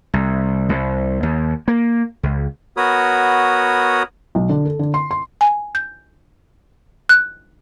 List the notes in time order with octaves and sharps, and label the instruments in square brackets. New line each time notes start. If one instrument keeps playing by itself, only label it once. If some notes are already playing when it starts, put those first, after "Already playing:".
[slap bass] C2
C2
D#2
A#3
C#2
[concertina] B3 F#4 A#4 C#5 B5 D#6
[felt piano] B1
D3
A4
D3
C6
C6
[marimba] G#5
G6
F#6